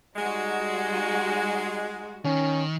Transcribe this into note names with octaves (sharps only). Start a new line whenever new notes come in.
G3 G#3 D#4 F#4
D#3 C#4